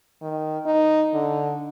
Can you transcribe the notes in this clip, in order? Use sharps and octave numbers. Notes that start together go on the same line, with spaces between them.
D#3
D#4
D3